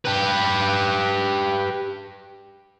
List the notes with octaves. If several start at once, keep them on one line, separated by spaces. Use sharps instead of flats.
G4 B4